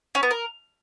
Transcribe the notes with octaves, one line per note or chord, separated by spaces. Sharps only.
C#4
B3
A#4